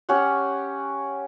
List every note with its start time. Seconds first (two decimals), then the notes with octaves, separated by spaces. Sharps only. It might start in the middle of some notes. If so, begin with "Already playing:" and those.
0.09 C#4 G4 C#5 F#5